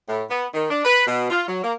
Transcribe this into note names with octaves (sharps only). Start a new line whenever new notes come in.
A2
B3
D#3
D4
B4
B2
F4
F#3
A#3